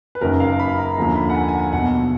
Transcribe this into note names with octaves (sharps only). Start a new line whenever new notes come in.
B4
F#1 F#2 D#3 A#4
F5
B5
A#5
D#2 D3 F3 A#5
B5
F#5
G#5
G#5
F#5
B1 B2 F#5